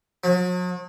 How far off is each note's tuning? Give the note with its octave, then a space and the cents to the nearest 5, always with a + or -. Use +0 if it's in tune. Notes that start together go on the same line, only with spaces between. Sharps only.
F#3 -45